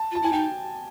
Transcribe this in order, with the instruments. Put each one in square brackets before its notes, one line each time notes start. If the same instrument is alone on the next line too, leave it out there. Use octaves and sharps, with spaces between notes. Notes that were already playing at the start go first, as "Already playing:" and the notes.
Already playing: [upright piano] A5
[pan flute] F4
[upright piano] A5
[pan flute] E4 [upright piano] G#5
[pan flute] D#4 [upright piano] G5